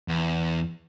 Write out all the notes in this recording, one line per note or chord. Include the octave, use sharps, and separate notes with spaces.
E2